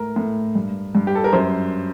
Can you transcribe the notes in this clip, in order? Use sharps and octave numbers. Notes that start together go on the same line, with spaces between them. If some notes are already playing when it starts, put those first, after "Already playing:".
Already playing: A2 A#4
A2
G2
G2
G4
A4
A#4
F#2 C5